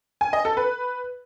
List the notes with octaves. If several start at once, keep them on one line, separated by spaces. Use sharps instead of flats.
G#5
D#5
A4
B4